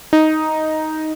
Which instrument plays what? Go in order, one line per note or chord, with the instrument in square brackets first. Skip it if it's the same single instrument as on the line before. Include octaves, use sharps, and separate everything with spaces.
[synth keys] D#4